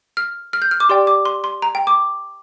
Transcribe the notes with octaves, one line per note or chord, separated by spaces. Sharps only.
F6
F6
G6
F6
D6
G4 D5 G5 C6
D6
C6
C6
A#5
G5
D6